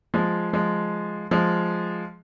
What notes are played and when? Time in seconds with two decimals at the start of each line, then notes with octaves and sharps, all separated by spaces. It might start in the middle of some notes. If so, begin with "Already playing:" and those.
0.14 F3 G#3
0.53 F3 G#3
1.31 F3 G#3